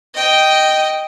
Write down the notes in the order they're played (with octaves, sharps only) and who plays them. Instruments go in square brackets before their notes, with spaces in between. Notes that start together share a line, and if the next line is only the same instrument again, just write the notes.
[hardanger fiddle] D#5 G5